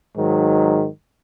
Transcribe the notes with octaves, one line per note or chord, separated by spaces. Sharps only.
G#2 D#3 F#3